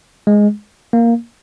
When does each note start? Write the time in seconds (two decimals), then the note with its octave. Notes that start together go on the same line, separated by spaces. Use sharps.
0.27 G#3
0.93 A#3